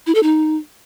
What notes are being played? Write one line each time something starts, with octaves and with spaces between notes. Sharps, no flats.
E4
A4
D#4